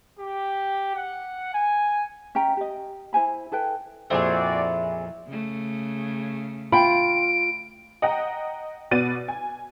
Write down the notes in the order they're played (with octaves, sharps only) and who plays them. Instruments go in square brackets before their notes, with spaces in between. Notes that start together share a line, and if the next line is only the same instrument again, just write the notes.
[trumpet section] G4
F#5
G#5
[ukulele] C#4 E5 G5 A#5
G4 D#5
E4 C5 G#5 B5
E4 A4 B4 G5
[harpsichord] F2 A#2 [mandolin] C4 G#4 [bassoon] E4 [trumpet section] F#4 D5
[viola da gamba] C#3 A3
[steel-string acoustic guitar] F4 [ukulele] G5 B5 [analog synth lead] D7
[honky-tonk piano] D#5 F#5 G5 A#5
B2 B3 F#4 D5 A6 D#7
G#5